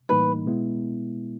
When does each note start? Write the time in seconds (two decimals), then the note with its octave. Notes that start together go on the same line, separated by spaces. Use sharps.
0.09 A2 E3 G3 A#3 D#4 B4
0.46 B2 G#3 B3 E4